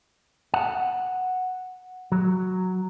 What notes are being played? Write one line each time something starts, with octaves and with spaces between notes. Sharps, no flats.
F#5
F#3